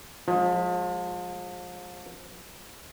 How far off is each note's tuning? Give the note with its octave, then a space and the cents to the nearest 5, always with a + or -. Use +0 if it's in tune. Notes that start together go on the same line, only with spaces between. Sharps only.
F3 +35 G#3 +0